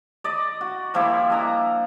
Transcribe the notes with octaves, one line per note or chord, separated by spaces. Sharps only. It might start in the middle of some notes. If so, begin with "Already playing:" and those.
D5 D#5
F#4
F3 G3 A#3 E4
D4 D#5 A#5